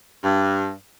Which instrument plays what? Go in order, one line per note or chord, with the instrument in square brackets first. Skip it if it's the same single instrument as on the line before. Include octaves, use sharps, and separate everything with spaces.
[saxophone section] G2